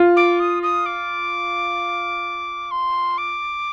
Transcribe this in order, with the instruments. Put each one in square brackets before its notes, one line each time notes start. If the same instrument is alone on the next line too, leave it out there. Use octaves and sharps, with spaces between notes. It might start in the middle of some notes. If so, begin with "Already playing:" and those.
Already playing: [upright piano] F4
[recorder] D6
D#6
D#6
D6
C6
D6